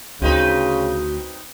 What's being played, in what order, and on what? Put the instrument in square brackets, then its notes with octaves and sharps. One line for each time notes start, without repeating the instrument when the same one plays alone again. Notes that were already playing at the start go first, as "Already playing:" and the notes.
[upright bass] D2 D4 [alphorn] C#3 [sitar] C4 D#4 B4 [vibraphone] F#4